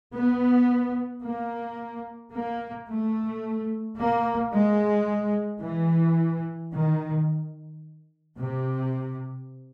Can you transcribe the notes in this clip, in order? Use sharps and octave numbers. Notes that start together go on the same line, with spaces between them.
B3
A#3
A#3
A3
A#3
G#3
E3
D#3
C3